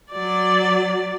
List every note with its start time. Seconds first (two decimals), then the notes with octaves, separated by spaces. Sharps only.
0.12 F#3 D5